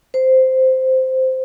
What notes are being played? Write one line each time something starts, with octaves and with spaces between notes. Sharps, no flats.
C5